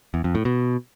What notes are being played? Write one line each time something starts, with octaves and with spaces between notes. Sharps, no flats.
E2
F2
A2
B2